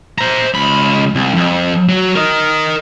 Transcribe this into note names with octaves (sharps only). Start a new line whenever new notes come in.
C5 A#5
C#2 B5
C2
F2
F#3
A#4 D#5